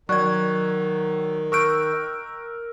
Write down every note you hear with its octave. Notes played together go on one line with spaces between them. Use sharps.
D#3 F#3 D5 C#6 F#6 G#6
A#4 C#6 E6 F#6 G6 D7